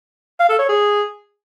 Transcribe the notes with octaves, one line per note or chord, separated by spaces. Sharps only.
F5
A4
C#5
G#4